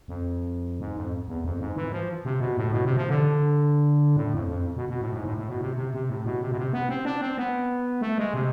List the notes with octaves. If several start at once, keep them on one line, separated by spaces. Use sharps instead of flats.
F2
G#2
F2
E2
F2
G#2
E3
F3
C3
B2
A2
B2
C3
F3
D3
A2
F2
F2
B2
B2
A2
G#2
A2
A2
B2
C3
C3
C3
A2
B2
C3
B2
C3
B3
C4
D4
C4
B3
A3
G#3
C3